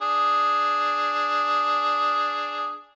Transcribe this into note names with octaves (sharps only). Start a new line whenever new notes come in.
D4 G#4